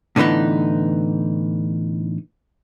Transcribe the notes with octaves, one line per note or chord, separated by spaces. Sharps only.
A2 D3 E3 B3 D#4